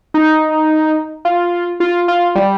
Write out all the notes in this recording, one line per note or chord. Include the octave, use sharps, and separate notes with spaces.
D#4
F4
F4
F4
G3